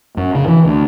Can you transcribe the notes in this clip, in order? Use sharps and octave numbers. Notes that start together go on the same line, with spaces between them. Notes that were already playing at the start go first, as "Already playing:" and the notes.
F#2
C#3
E3
D2